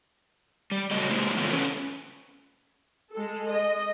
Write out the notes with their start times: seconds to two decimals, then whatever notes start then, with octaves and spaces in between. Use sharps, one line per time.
0.71 G3
0.91 C#3 F#3 A3 F#4 G4 D#5
1.10 G#3 A#3 E4 C5
1.37 C#3 E3 A3 B3 F4 C5
1.51 C#4 A4 B4
3.14 G#3 A4
3.48 D#5